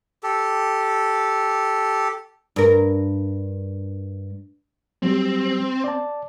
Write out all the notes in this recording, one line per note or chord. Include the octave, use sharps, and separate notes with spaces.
G4 A4
G2 A#4
F#3 G3 C4 G4
D5 A5